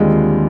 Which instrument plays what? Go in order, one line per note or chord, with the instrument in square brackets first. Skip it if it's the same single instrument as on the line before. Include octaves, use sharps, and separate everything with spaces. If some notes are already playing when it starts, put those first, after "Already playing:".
Already playing: [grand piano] D#2 D3 G3 C4 F4 [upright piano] G#3